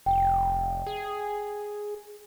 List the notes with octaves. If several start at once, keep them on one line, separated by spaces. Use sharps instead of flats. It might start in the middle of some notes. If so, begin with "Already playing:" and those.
F1 G5
G#4